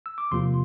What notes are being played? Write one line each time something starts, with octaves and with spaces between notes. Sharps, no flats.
E6
D6
E2 C3 F3 A#3 F4 C6